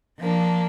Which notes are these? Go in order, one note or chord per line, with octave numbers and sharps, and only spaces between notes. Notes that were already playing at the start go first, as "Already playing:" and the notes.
F3 A#3 D4